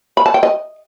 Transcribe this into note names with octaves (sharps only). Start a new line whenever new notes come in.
B5
A5
G5
D#5